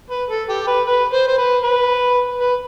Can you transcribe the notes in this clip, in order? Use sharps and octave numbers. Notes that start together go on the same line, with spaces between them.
B4
A4
G4
B4
B4
C5
C5
B4
B4
B4